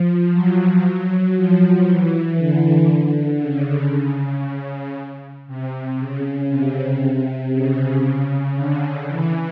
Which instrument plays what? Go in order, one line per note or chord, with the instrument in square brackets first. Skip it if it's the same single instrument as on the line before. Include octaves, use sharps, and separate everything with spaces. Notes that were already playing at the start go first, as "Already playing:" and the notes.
Already playing: [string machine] F3
F#3
F3
E3
D3
C#3
C3
C#3
C3
C#3
D3
E3